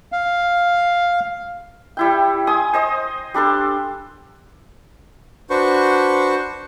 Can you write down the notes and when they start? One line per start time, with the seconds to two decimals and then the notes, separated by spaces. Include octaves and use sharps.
0.12 F5
1.97 G3 E4 G5
2.47 G#5 C6 D#6
2.73 C5 D#5 D#6
3.34 G3 D4 A4 C6
5.50 D4 F#4 B4 C5 C#6